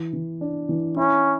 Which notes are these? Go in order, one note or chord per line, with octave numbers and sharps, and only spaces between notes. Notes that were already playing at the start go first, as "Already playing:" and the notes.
Already playing: E3
E3
D4
E3
C#4 E4